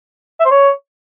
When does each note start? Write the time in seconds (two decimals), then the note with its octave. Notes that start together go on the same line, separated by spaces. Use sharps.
0.40 E5
0.45 C5
0.51 C#5